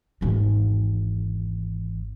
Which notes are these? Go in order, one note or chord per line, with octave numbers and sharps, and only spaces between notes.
G#1 E2